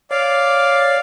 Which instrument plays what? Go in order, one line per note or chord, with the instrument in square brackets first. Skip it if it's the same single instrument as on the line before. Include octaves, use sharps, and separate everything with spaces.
[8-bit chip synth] C#5 [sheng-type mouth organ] D5 F5